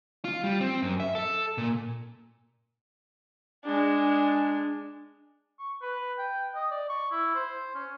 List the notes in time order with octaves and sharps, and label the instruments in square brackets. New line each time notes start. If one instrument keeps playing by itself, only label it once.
[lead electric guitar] F4
G3
C4
F#2
E5
A4
A#2
[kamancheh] G#3 D4
[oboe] C#6
B4
G5
D#5
D5
C#6
E4
C5
C#4